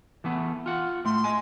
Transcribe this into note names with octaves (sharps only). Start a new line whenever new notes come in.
E3 A3 B3
F4 F#5
A2 A3 C6
D#5 G#5